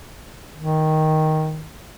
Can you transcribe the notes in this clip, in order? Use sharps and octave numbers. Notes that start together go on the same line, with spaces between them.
D#3